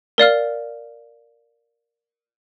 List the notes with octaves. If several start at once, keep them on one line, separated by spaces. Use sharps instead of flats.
A#4 D5 F5 F6